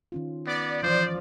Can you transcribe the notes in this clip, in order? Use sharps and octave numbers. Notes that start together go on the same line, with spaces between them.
D#3 C#4 F4
B3 D5
E3 F3 C5